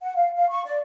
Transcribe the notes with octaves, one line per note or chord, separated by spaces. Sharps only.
F#5
F5
F5
C#6
D5